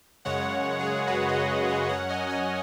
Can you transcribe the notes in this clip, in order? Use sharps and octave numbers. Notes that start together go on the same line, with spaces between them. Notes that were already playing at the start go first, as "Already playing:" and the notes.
F#2 C#3 G#3 C#5 F#5
G#4 C#5
F#2 C#3 G#3 F#4 B4
B4 D#5
C#5 F#5
F#2 F#3 C#4 C#5 F#5
D#5 G#5
C#5 F#5